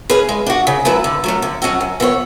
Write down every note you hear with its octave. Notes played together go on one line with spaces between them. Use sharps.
C#4 G#4 B4
G#3
D4 F#4
C#3
F#3 A3 E4 B4
D3
F#3 A3 C#4
D3
F#3 C#4 F#4 A4
F#2
E3 B3 F#4 C#5